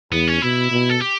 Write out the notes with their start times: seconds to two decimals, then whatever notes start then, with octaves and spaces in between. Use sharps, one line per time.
0.12 E2 B3
0.27 C#4
0.42 B2 E4
0.71 B2
0.90 A4
1.01 G4